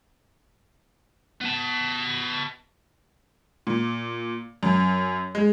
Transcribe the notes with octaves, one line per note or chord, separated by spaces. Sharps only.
B3 A5
A#2
F#2
G#3